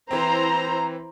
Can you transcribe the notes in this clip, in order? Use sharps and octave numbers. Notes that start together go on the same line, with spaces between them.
E3 C4 E4 C5 A#5